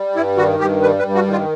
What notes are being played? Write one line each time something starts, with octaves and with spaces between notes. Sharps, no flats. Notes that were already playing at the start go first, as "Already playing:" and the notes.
Already playing: G3
G2 E4
D#3 F#4
G2 G4
G3 B4
B4
G2
F#4
D#3
F4